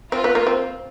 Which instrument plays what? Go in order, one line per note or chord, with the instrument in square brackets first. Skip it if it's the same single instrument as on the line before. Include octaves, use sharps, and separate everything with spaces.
[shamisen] C4 [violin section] F4
[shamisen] B3
A#3
C4